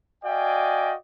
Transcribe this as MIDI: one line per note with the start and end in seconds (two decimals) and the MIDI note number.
0.24 0.94 66
0.24 0.94 74
0.24 0.94 75
0.24 0.94 77
0.24 0.94 79
0.24 0.94 80